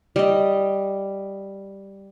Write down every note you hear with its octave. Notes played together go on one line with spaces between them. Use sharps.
G3 D#5